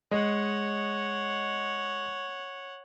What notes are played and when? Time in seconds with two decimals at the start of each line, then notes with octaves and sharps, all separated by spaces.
0.11 G#3 C#5 D#5 F#5